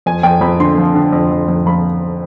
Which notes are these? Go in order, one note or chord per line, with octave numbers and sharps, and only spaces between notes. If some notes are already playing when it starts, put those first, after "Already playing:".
F2 G#5
F2 G5
F2 B5
D3 C6
F3
D3
F2
F2
F2
F3 B5